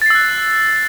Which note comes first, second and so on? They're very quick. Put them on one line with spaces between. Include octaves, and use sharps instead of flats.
A6 C7 E6 F#6